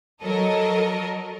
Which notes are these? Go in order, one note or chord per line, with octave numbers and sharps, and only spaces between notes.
F#3 A4 A#4 D#5